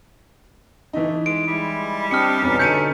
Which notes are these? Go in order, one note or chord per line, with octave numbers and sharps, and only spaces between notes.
E3 A3 D#4
G#3 D7
G3 G#3 E4
C4 D4 G4 D#5 F6 C#7
E2 B2 C#4 D#4
D3 A3 G6 C#7 D#7